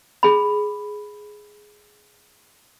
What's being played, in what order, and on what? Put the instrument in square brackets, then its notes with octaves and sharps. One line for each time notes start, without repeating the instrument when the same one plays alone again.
[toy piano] G#4 B5